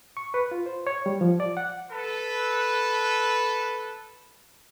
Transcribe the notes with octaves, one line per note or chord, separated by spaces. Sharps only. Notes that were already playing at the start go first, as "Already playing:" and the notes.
C#6
B4
F4
C5
C#5
G3
F3
D5
F#5
A4 B4